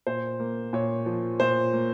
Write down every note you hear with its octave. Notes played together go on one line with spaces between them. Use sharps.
A#2 C5
A#3
A#2 C#5
F3
A#2 C5
A#3